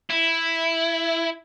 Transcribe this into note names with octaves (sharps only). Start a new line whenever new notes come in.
E4